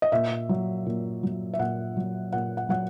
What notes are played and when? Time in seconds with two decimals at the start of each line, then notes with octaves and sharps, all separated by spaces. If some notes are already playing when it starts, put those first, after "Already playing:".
0.02 D#5
0.12 A#2 E5
0.49 F#3
0.86 A#2
1.23 F#3
1.54 E5
1.59 A#2 F#5
1.97 F#3
2.33 A#2 F#5
2.57 F#5
2.69 F#3 F#5